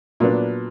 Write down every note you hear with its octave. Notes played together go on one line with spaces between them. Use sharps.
A#2 F#3 B3 D4